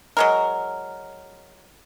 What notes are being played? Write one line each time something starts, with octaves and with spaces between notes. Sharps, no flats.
F#3 G#3 A#4